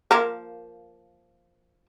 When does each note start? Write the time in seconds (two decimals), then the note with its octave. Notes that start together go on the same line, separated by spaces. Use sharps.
0.11 F3 A#3 A#4